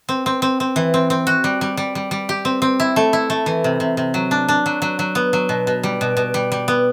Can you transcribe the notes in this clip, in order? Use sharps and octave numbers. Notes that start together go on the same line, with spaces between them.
C4
C4
C4
C4
E3
C4
C4
F#4
G3
G3
G3
G3
G3
G4
C4
C4
E4
A3
E4
A3
E3
C3
C3
C3
F#3
D4
D4
F#3
F#3
F#3
B3
F#3
B2
B2
G3
B2
B2
G3
G3
B3